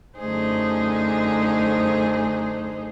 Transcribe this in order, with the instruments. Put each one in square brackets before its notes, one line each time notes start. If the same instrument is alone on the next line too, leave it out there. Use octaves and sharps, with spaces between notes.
[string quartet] F#2 D3 A3 D#4 G#4 C5